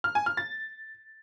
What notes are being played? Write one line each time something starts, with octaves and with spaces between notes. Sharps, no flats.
F6
G#5
F6
A6